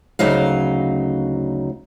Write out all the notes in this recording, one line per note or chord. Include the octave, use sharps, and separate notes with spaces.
D2 C#3 F#3 D#4 F5